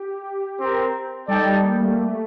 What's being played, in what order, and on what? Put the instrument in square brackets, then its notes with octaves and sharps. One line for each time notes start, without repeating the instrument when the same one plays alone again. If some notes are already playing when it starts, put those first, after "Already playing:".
Already playing: [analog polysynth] G4
[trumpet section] C4 G4 A#4
[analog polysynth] G3 [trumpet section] D#4 A4 D5 G5
[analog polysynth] A#3
A3
G3
A3